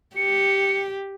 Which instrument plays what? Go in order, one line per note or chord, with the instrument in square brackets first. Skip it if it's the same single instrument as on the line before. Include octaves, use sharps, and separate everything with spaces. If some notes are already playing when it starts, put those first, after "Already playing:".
[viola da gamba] G4 [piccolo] C#7